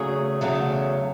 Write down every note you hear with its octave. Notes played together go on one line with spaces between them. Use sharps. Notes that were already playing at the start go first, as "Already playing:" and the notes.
Already playing: E2 C#3 F#3 A3 G#4
E2 C#3 F#3 A3